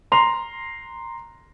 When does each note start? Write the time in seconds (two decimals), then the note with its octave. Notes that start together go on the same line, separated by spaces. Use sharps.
0.12 A#5 C6 F7